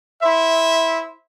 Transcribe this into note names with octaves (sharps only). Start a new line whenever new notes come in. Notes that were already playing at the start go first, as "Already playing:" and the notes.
E4 C5 E5